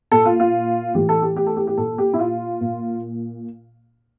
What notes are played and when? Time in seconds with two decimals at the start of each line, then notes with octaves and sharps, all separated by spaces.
0.12 A#2 A4
0.26 F4
0.40 F4
0.95 A2 E3 G4
1.09 A4
1.22 G4
1.36 G4
1.47 A4
1.57 G4
1.67 G4
1.77 A#2 A4
1.98 G4
2.14 E4
2.19 F4
2.61 A#2